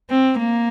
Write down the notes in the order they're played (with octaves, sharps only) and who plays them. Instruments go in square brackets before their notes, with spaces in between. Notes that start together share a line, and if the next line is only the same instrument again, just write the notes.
[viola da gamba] C4
A#3